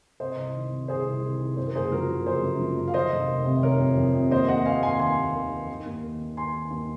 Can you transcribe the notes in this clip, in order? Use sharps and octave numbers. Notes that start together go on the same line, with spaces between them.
C3 C5 D#5
C2
D#3
C3
C2 G#4 C5
C2
C2
D#3
F#2 C5
A#4
F#1 G#4 C5
F3 F#4 A#4
F#1
F#1 G#4 C5
F#2
F3
F#2
F5
D#3 C5 D#5
F1
D#3
C3
D#3 A#4 C#5
F2
F2
C3
D#2 C5 D#5
D#2 D#5 F#5
D#2 F5 G#5
D#2 G#5 C6
D#3 G#5 C6
D#2
D#3
D#3
D#3
D#2
D#3
D#3
D#3 G#5 C6
D#3
D#2